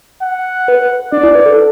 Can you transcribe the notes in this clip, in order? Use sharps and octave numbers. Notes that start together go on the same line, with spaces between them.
F#5
B4
D4 D5
E4
B4
A4